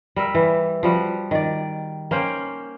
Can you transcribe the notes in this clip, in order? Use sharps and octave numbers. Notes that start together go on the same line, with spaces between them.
G3 A#4 E5
E3
F3 G3 F#4
D#3 D5
A#3 C#4 C5 G5